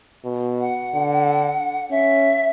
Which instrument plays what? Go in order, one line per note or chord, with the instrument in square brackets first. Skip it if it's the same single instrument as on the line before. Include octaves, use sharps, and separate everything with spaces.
[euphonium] B2
[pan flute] F#5
[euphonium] D3
[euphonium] C#4 [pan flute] E5